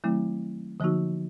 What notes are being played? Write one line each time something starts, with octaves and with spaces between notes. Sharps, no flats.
D#3 F#3 A3 C4 E4
D3 F3 A#3 D#4 F#4